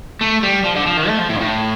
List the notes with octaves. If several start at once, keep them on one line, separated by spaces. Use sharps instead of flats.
A3
G3
F3
D3
F3
D#3
A3
F3
A2
G2
A2